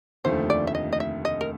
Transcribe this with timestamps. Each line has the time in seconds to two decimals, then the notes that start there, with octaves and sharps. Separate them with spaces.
0.24 F1 D#2 D3 F3 A3 C5
0.50 D5
0.67 E5
0.75 D#5
0.93 D#5
1.00 E5
1.25 D#5
1.41 A#4